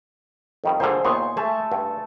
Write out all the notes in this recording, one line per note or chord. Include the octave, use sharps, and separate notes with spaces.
F2 D#3 G3
G2 A#2 D3 G#4 C5
D#2 A#2 B3 C6 C#6
A3 G#4 E5 A5
G2